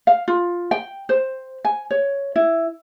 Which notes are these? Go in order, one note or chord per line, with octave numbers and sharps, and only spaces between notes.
F5
F4
G5
C5
G#5
C#5
E4